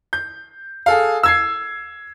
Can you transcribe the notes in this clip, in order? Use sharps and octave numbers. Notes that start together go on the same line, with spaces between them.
G6
G#4 A4 F5
E6 G#6 C7